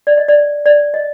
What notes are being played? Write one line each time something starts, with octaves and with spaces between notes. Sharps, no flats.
D5
D#5
D5
D5
D#5